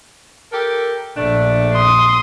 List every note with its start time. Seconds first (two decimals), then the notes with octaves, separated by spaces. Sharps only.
0.52 G4 A4 A#4
1.17 A#1 A3 D4
1.74 C6 D#6